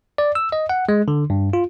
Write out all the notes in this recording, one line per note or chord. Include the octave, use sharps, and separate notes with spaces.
D5
E6
D#5
F#5
G#3
D3
G2
F4